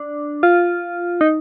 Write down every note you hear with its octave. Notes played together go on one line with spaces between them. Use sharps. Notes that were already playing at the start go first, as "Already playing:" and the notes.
Already playing: D4
F4
D#4